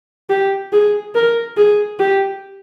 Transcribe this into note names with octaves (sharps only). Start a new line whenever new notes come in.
G4
G#4
A#4
G#4
G4